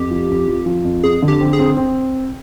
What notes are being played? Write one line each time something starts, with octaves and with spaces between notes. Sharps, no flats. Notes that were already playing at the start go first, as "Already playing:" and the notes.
Already playing: F2 G4
F3
F2
F3
F3
F2
F2 G#4
D3
G4
C4
G#4
C4
C4